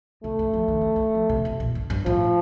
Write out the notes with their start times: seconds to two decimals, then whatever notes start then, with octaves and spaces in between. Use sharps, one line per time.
0.24 C3 A3
0.39 D3
0.54 F3
0.68 D#3
0.81 D3
0.96 D#3
1.15 F3
1.29 C3
1.45 C3
1.60 A#2
1.75 G2
1.90 G2
2.06 A2 F3